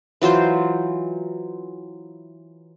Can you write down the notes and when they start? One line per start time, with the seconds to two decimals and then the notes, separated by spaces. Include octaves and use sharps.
0.22 E3 F#3 F4 C5